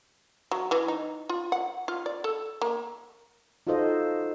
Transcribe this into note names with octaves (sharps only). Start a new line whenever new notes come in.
F#3
E3
D#4
F4
F#5
F4
D5
A4
A#3
D#4 F4 F#4 A4 C5 D#5